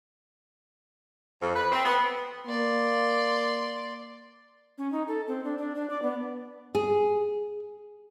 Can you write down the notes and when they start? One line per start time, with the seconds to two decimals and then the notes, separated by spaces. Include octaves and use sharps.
1.41 F2
1.55 B4
1.72 C4
1.84 B3
2.47 A#3 D5 C6
4.78 C#4
4.92 D#4
5.08 A4
5.28 C4
5.44 D4
5.58 D4
5.75 D4
5.90 D5
6.02 B3
6.75 G#4